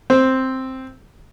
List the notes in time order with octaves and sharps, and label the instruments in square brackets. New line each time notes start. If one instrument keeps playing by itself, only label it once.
[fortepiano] C4